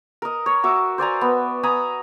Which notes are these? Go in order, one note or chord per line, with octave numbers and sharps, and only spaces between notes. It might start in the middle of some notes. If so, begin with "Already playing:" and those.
A#4 D#5
C#5
F#4 E5 D6
C5 D5 G#5 A#5
B3
G#5 A#5 B5 D#6